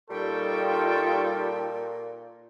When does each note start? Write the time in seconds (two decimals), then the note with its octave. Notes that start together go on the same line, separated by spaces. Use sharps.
0.10 A#2 G3 D#4 F4 A4 G5 C#6